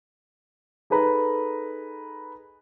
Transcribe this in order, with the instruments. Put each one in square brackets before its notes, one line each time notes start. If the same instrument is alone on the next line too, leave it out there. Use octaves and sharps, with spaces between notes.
[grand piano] D#4 G#4 A4 B4 A#5